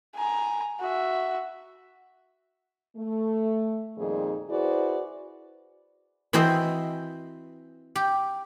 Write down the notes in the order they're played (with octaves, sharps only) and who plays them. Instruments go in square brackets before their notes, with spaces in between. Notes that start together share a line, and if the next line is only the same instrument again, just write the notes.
[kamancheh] G#5 A#5
F#4 E5
[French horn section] A3
F2 A#2 D#3 G3 D#4 G#4
E4 F#4 G#4 B4 C5 D5
[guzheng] E3 C4 E4 F#4 C5 D#5
G4